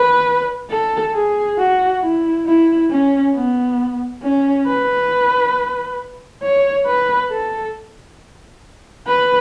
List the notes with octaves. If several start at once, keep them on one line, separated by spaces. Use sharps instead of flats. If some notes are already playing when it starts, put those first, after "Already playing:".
Already playing: B4
A4
G#4
F#4
E4
E4
C#4
B3
C#4
B4
C#5
B4
A4
B4